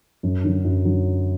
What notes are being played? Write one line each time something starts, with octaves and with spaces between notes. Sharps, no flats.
F#2
D3 F#3
F#2
D3 F#3